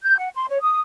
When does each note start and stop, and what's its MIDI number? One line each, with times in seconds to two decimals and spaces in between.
0.02 0.17 91
0.18 0.29 78
0.34 0.46 84
0.49 0.59 73
0.61 0.79 87